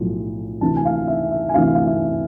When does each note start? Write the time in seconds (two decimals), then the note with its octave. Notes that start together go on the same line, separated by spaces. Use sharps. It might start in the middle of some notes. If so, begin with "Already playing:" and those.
Already playing: B1 A2 F3
0.61 D2 C3 E3 A5
0.77 G#5
0.85 F5
1.08 E5
1.31 E5
1.49 G#5
1.54 D2 C3 E3 F5
1.75 F5
1.86 E5